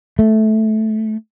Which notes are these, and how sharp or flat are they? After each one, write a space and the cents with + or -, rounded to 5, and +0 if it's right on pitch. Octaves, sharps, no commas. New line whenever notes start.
A3 -15